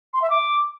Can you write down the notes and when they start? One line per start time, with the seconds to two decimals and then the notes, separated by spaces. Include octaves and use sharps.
0.14 C6
0.22 E5
0.30 D6